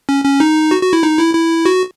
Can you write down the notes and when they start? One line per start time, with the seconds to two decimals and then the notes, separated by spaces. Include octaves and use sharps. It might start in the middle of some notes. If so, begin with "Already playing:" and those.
0.09 C#4
0.24 C#4
0.40 D#4
0.71 F#4
0.82 F#4
0.93 E4
1.03 D#4
1.19 E4
1.35 E4
1.65 F#4